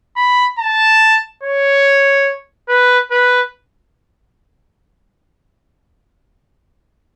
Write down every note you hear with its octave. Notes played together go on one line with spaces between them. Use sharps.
B5
A5
C#5
B4
B4